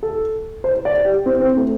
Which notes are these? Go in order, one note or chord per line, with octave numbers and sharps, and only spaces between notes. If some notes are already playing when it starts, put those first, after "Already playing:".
A4
C5
D5
G4
C4
C4
A3